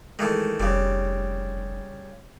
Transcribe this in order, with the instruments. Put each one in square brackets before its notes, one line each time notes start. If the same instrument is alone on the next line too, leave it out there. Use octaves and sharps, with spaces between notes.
[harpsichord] D#3 E3 A3 [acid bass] G#3
[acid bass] F1 [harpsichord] C#3 G3